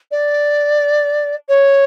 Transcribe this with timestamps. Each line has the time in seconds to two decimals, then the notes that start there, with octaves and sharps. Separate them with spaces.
0.11 D5
1.49 C#5